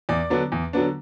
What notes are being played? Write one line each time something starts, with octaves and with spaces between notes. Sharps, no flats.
E2 D5 D6
D3 F#3 B3 D4
E2
D3 F#3 B3 D4